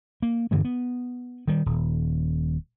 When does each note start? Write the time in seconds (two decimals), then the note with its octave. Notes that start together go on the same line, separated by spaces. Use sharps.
0.22 A#3
0.51 G2 D3 E3 A3
0.65 B3
1.47 D#3 G3
1.66 D#1